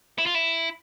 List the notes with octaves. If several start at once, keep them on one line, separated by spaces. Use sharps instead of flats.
E4
F4
E4